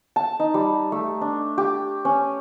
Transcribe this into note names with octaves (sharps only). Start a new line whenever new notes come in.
A5
D#4
G3
A3
D4
G4
C#4